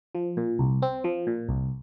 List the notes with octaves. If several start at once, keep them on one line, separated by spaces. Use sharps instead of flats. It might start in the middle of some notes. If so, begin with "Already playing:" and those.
F3
A#2
C2
C4
F3
A#2
C2